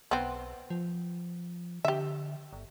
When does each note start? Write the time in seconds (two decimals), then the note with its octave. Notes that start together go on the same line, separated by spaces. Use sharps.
0.11 B1 B3 C4
0.70 F3
1.85 D3 G4 E5
2.53 G1